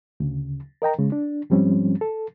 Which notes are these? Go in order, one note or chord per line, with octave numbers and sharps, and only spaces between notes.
D2 C#3
A#4 D#5 G5 A#5
C#3 G#3
D4
G#2 F3 G3 C4 C#4
A4